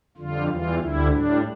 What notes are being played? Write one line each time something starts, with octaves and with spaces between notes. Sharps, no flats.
F2 D3 G3 F4
E2 E3 G3 F4
D2 D3 G3 E4
A2 G3 D4